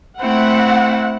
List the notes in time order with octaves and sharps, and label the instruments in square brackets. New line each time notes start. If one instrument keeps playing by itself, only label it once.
[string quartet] A3 C4 E4 [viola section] F#5